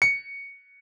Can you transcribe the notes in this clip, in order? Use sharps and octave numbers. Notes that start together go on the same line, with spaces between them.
C#7